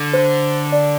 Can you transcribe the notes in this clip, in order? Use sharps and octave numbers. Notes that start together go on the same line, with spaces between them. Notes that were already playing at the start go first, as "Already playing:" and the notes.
Already playing: D3
C5
D5